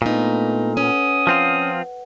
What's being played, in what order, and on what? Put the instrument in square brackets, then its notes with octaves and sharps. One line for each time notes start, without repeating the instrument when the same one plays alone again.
[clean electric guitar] A#2 [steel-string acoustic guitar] A3 D#4 [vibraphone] B3 D4 B4
[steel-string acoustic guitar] C#4 [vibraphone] B4 F#5 [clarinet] D#6
[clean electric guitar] F3 C4 F4